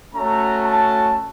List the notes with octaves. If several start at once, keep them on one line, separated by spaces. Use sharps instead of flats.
A3 C#4 F#4 A#5
A5